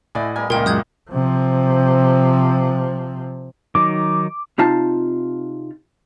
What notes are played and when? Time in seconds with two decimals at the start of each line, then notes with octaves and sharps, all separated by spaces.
0.15 A2 E4 D5 D#5 F#5 G#5
0.36 G3 B3 A#4 G#5
0.50 C#2 A#2 A#3 A#4 G5
0.66 F#2 G#3 F#5 D#6 G6 G#6
1.10 C3 F3
3.75 D#3 F#3 D#4 D6
4.58 C3 D#4 F4 A5